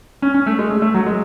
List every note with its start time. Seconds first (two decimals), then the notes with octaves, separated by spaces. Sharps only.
0.22 C#4
0.34 C#4
0.46 A3
0.59 G#3
0.70 A3
0.82 A3
0.94 F#3
1.06 G#3